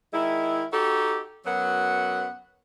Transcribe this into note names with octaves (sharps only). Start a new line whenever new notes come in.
D#3 G#3 E4
D#4 F#4 G4 A4
F#2 F#3 B3 F#5